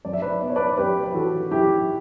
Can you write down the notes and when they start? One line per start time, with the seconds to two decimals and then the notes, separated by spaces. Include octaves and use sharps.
0.05 F#2 D5
0.13 E5
0.22 B4 D5
0.41 B3 D5
0.49 C#5
0.56 B4 D5
0.78 F#2 G4 B4
1.04 B4
1.14 E3 F#4 A4
1.51 F#2 E4 G4